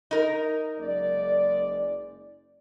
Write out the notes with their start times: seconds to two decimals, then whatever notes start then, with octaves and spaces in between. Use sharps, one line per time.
0.11 D#4 A#4
0.79 F#1 G#3 D5